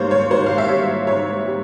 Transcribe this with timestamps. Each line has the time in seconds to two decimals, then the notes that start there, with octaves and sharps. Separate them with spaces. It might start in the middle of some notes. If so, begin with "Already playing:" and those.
Already playing: G#2 G3 A#3 C5 C#5 F5
0.11 C#5
0.31 G#2 C5
0.46 F5
0.58 E5
0.68 G3 A#3 C#5
1.07 G#2 C#5
1.46 G3